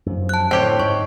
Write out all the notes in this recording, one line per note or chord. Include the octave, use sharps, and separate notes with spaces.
F#2 F3
A5 F#6
A2 D3 C4 G4 C#5
G#2 G#3 C#6